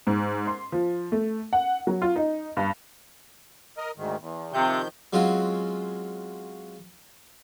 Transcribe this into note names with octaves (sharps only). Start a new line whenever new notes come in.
G#2
C6
F3
A3
F#5
F#3
F4
D#4
G2
A#4 D#5
D2 G#2 D#3
E2
C3 D#3 F3 G6
F#3 G#3 C4 C#4 F4 F#4